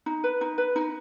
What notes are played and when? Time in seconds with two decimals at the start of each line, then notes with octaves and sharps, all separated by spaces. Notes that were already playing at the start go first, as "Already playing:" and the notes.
0.06 D#4
0.24 B4
0.41 D#4
0.58 B4
0.76 D#4